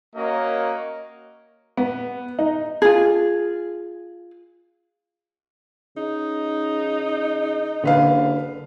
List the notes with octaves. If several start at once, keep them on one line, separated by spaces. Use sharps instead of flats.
A#3 C#4 F#4 A#4 C#5 D#5
B3
D#4
F4 G#4
C#3 D#4
F#1 D3 B4 F5